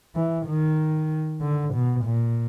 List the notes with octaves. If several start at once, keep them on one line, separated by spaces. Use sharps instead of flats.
E3
D#3
D3
B2
A#2